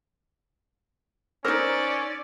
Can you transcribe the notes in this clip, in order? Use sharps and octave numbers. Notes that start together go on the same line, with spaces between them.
C#4 D#4 A#4 C5 D5 D6 E6